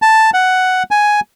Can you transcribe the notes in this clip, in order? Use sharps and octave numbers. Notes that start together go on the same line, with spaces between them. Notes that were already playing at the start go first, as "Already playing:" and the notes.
A5
F#5
G#5